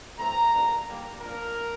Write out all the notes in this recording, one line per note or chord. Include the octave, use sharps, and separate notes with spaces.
E3 A3 C4 A#5
E3 G3 A#3 D4
D3 G3 A#3
A#2 F3 A#3 D4 A#4